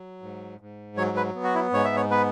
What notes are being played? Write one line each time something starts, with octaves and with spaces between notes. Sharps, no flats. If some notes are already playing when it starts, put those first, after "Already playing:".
Already playing: F#3
G#2
G#2
F#3 C#5
B4
B3
F#4
E4
G#2 C#5
E5
C#5
B3 B4